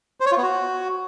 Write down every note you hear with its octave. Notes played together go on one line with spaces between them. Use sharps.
C5
C#5
F4
B3
F#4